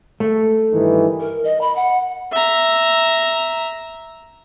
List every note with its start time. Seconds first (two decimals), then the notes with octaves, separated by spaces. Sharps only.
0.20 A3
0.71 G2 D#3 E3
1.19 A#4
1.44 D#5
1.61 B5
1.76 F#5
2.32 E5 A#5